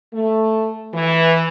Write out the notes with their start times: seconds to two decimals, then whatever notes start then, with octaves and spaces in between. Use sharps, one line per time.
0.13 A3
0.93 E3